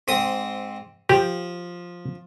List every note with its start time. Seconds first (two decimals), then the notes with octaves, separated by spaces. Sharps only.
0.08 G#2 C4 D#6
1.09 F3 G4